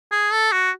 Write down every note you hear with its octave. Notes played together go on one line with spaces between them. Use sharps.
G#4
A4
F#4